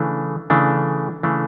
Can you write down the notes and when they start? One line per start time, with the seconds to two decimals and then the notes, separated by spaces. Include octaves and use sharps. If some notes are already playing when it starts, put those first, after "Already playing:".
Already playing: C#3 E3 A3 D4
0.50 C#3 E3 A3 D4
1.23 C#3 E3 A3 D4